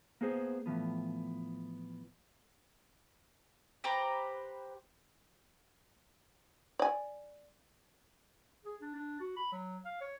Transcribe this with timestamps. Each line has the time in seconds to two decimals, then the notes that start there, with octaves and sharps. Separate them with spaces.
0.21 A#3 B3 G#4 C5
0.66 A2 E3 F3 B3
3.84 G4 B4 C5 A#5
6.79 D5 G#5
8.65 G#4
8.81 D4
8.95 D4
9.20 F#4
9.36 B5
9.52 F#3
9.85 F5
10.01 C#5